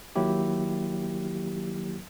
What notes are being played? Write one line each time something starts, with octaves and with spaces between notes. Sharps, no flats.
D#3 F#3 A#3 E4 G4